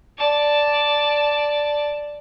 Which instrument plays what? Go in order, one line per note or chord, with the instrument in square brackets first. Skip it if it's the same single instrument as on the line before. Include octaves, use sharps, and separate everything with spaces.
[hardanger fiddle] D5 A5